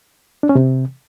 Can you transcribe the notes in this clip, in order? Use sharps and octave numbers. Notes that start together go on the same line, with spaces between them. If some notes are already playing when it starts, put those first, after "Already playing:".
D4
C#4
C3